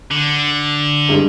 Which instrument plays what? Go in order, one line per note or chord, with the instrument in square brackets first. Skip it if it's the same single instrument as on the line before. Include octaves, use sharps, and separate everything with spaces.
[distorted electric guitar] D3
[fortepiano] G2 G#3